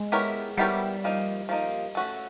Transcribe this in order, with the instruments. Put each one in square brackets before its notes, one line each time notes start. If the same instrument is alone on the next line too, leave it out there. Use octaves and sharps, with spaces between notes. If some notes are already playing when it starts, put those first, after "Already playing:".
Already playing: [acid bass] G#3
[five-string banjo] B3 E4 G4 A#4 C#5
[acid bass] G3 [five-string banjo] B3 E4 G4 A#4 C#5
[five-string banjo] F3 A#3 D#4
F3 A#3 D#4
A3 C#4 F#4 A4